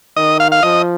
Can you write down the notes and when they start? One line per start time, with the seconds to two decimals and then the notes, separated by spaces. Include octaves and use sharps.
0.16 D#3 D#5
0.40 F5
0.52 F5
0.63 F3 D#5